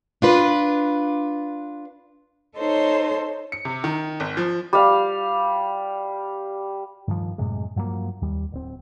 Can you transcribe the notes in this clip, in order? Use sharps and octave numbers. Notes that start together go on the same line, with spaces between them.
D4 F4 B4
D#4 A4 C5 C#5 C6
C#7
C3
D#3
G#1
F3
G3 F5
G2 D#3 F3
F#2 A2 C3 G#3
G2 F3 F#3 A#3
D#2 G3
D1 C4